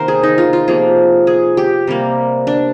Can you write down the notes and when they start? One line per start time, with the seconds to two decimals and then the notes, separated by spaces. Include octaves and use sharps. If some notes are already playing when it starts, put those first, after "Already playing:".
Already playing: C3 D#3 A#3 A#4 C5
0.08 G#4
0.23 D#4
0.38 F4
0.53 F4
0.68 C3 F3 A#3 G#4
1.27 G#4
1.57 G4
1.87 C3 G3 A#3
2.47 D4